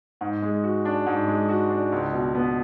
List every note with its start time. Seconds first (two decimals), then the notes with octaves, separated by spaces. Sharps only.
0.21 G#2
0.42 G#3
0.64 F#4
0.85 D4
1.06 G#2
1.28 G#3
1.49 F#4
1.70 D4
1.92 C#2
2.13 B2
2.35 B3